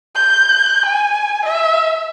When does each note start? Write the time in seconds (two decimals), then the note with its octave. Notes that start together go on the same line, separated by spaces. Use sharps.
0.15 G6
0.86 G#5
1.46 E5